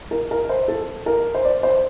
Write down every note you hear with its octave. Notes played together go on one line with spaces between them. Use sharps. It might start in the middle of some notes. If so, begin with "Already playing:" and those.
A#4
A#4
C5
A4
A#4
C5
D5
C5